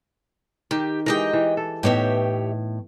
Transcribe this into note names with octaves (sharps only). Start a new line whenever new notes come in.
D#3 G4
E3 G#3 G4 A#4 D#5 G5
E3
A4
A2 B3 D#4 G4 C#5 E5